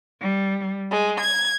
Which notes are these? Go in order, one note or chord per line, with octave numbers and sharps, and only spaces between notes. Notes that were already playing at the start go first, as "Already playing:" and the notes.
G3
G#3
G#6